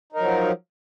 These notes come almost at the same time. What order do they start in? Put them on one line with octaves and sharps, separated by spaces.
D#4 A#4 F#3 F3